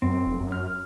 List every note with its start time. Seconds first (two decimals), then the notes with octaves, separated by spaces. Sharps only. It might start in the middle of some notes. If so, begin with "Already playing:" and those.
0.02 F#2 C4
0.26 F1
0.40 F#2
0.52 F6